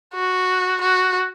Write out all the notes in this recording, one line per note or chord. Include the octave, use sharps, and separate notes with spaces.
F#4
F#4